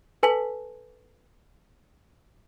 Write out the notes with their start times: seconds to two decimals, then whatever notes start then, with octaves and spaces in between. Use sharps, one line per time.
0.23 A4 B4 G#5 A5 B6 F#7